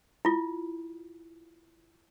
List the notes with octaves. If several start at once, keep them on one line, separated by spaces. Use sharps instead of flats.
E4 F4